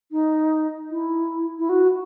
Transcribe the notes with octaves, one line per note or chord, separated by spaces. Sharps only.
D#4
E4
E4
F#4